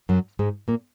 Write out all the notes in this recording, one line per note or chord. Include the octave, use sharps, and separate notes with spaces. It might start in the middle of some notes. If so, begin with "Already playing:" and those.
F#2 F#3
G#2 G#3
A#2 A#3